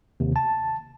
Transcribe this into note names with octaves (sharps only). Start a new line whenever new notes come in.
D#2 C3
A5